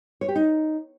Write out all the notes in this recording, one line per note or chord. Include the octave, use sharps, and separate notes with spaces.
C#5
G4
D#4